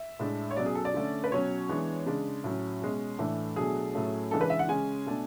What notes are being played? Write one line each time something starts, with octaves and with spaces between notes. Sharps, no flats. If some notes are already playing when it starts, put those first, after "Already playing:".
Already playing: E5
A2 G#3 D4
C#5
B2 F#3 C#4 D5
G#4
A4
D5
D3 A3 C#4
B4
B2 F#3 C#4 C#5
E3 G#3 B3 D4
C#3 G#3 D4
A2 F#3 C#4
B2 G#3 C#4
A2 E3 A3 D4
B2 F#3 A3 D4 G#4
A2 F#3 A3 C#4
C#3 E3 G#3 D4 A4
B4
E5
F#5
C#3 G#3 C#4 G#5
B2 A3 D4